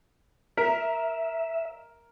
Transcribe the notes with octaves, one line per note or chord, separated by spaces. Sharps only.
A#4 E5